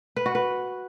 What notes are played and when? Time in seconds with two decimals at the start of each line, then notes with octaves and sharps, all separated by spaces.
0.16 B4
0.26 F#4
0.35 B4